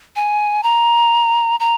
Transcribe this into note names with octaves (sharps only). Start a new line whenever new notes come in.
G#5
A#5
A#5